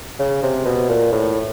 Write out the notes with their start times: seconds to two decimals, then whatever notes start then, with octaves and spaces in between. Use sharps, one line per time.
0.19 C#3
0.43 C3
0.66 B2
0.89 A#2
1.12 A2